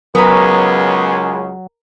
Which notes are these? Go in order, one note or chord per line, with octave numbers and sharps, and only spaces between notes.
C#2 C#3 F#3 G#3 B3 A#4 B4 A#5